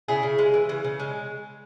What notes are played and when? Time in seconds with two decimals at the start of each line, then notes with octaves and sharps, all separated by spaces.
0.08 C#3 E4 G#4
0.23 C#3
0.39 G#3
0.54 E3
0.69 C#3
0.85 C#3
0.99 G#3